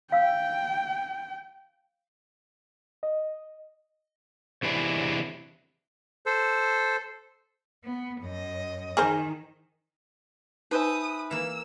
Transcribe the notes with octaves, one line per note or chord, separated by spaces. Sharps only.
F5 G5 E6
D#5
C3 E3 F#3 D4 E4 G#4
A4 C5
B3
F#2 D#5
D#3 G#4 A#4 C5
D#4 B4 C5 E5 G#5 D#6
E3 A#3 E6